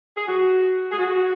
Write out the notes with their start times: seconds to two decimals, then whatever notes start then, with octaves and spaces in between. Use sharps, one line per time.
0.16 G#4
0.27 F#4
0.91 G#4
0.98 F#4